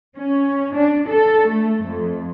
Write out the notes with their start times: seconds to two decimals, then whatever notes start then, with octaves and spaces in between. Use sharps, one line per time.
0.16 C#4
0.74 D4
1.08 A4
1.49 A3
1.85 F2